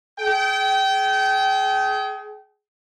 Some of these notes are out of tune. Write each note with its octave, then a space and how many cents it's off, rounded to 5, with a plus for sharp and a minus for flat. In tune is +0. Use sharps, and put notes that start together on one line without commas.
G#4 +25 G5 -25